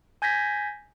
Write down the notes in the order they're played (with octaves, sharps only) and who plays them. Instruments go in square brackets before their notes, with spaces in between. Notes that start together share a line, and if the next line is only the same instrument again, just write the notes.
[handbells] G#5 G6 G#6 A#6 B6